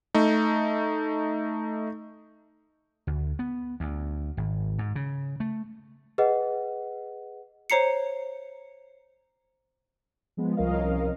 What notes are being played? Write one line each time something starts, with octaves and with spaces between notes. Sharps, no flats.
A3 D#4
D2
B3
D2
G#1
G#2
C#3
A3
G#4 B4 D#5 F#5
C5 C#5 A#5 C7 C#7
F3 G#3 B3
C2 F3 C#4 A#4 D#5 F5